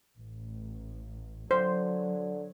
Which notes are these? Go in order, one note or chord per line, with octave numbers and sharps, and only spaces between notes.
A1
D3 F#3 C5